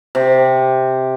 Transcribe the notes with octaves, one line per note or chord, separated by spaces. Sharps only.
C3